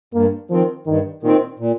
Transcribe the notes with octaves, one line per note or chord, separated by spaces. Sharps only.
G2 A#3
D#3 F3 C4
G2 D#3
A#2 D#3 C4
A#2